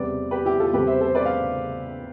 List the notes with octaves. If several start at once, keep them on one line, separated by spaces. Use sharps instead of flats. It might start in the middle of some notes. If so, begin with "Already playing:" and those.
Already playing: E2 C3 G3 C4 B4 D5
G4 B4
E4 G4
F4 A4
E2 C3 G3 C4 G4 B4
C5 E5
A4 C5
B4 D5
D5 F5